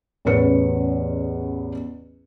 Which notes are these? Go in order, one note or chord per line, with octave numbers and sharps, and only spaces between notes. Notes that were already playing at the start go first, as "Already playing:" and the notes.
A1 E2 C#4 B4 C#7